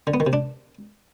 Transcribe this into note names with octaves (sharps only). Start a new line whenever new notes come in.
D3
B3
D#3
C3
D4